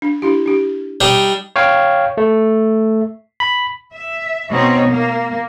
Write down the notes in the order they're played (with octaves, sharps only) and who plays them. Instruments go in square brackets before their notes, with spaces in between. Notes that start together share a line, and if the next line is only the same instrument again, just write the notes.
[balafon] D4
D4 E4 G4
D4 G4
[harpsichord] G3 D4 D#4 [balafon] C5
[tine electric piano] C#5 F5 G5
A3
B5
[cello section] E5
B2 C4 D#4 C#5
A#3